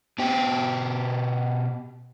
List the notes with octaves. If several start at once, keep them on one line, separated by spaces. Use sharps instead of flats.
B2 G4